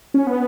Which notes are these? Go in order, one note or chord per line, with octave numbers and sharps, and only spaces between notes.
C#4
B3